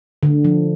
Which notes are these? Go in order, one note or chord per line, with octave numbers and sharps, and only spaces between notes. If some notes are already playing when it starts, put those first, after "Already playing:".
D3
F3